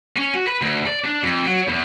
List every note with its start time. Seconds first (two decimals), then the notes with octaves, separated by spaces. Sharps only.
0.16 C#4
0.34 F#4
0.47 B4
0.62 D2
0.86 D5
1.04 D4
1.23 F2
1.46 F#3
1.67 E2